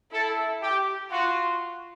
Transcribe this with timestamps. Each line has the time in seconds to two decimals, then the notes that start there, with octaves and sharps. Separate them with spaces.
0.12 E4 A4
0.62 G4
1.11 F4 F#4